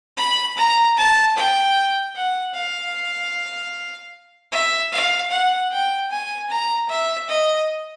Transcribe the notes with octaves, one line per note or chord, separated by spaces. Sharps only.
B5
A#5
A5
G5
F#5
F5
E5
F5
F#5
G5
G#5
A#5
E5
D#5